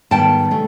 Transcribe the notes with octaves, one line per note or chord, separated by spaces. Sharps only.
G#2 D#3 G3 B3 G5 A5
C#3 A3